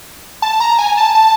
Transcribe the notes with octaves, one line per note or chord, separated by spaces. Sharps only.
A5
A#5
G#5
A5
A5